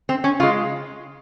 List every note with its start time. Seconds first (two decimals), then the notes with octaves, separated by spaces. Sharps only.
0.09 C4
0.24 C#4
0.40 C#3 G#3 F4